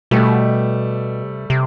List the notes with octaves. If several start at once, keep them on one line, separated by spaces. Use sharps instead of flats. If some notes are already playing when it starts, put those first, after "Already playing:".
B2 G3 A3
C3
C3